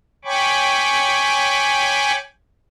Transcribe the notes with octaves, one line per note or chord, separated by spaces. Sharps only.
C#5 G5 G#5 B5 C#6 D6